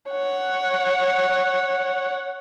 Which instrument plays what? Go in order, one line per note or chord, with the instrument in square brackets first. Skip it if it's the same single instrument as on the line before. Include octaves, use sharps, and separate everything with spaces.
[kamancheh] C#5 F#5